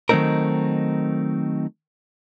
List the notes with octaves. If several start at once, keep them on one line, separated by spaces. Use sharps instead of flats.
D#3 F#3 A3 C4 D#4 A#4